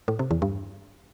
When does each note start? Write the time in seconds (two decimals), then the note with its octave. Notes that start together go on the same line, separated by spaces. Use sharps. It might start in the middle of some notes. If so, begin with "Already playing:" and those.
0.08 A2
0.19 C3
0.31 E2
0.42 G2